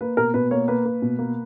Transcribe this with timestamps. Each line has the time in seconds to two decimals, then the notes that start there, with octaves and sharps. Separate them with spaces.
0.01 A#3 B4
0.17 B2 A#4
0.34 B2 B4
0.51 A#3 C#5
0.68 A#3 B4
0.85 A#3
1.02 B2
1.19 A#3